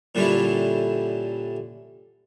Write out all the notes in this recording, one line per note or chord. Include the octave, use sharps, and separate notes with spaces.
A#2 D3 G3 C#4 E4